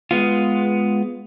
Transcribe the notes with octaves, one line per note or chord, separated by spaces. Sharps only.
G#3 B3 F4